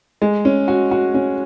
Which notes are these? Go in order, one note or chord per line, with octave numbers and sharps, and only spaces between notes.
G#3
C#4
F#4
F#4
C#4